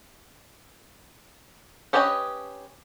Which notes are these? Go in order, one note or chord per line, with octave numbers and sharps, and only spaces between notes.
C#4 G4 B4 C#5 D#5